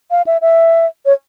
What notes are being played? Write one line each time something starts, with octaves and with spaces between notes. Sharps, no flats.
F5
E5
E5
C#5